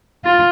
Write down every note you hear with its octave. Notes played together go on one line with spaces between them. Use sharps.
F4